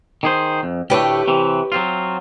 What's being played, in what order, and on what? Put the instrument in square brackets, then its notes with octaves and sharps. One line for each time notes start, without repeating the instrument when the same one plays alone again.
[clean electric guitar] D#3 G#4 C5
F2
[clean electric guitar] D2 A2 A3 [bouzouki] G4 B4 C#5
[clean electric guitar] C3 E3
F#3 C4 F4